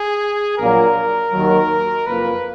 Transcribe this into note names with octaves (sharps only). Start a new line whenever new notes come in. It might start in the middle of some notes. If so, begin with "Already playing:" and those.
Already playing: G#4
A#1 A#2 F#3 A#3 A#4
D#2 D#3 F#3
F#1 F2 F3 A#3 B4